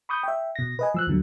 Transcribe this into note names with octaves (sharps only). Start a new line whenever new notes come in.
B5 C#6 D#6 G6
E5 G5
B2 A#6
B4 D#5 G#5
F3 E6 F#6
D#2 D3 F#3